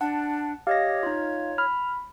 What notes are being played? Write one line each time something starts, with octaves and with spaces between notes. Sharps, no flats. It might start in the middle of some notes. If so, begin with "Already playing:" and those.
D4 F#5 A5
G4 C#5 D#5 F5 A#6
D#4 F4
B5 F6